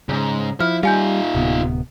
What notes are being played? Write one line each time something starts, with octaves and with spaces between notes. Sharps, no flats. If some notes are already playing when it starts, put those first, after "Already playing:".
F2 G#2 C#3
F3 E4 F6
G3 D#4 F4 F5 G#5 G6
D1 C3 B3